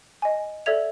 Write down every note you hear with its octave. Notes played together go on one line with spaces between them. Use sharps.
D#5 G#5
A4 D5 E5 G#6 F7